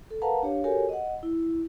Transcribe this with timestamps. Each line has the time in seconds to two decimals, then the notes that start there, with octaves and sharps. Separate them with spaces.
0.11 A4
0.22 A#4 B4 F5 F#5 A5 A#5
0.43 D4 G4 C#5 F5
0.64 F#4 G4 A4 A#4 C#5 G#5
0.89 D#5 F#5
1.23 E4